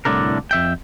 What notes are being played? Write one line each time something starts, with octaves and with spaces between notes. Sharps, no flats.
C2 A2 D3 D4 A#4
F2 E5 G5